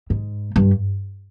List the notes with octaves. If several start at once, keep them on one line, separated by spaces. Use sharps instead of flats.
G#2
G2